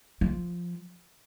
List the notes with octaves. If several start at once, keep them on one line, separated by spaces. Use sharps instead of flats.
F3